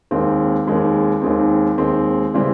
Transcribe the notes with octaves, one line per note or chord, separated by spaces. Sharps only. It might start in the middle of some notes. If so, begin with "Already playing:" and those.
D#2 D#3 G#3 C4
D#2 D#3 G#3 C4
D#2 D#3 G#3 C4
D#2 D#3 G#3 C4
C#3 E3 G3 C4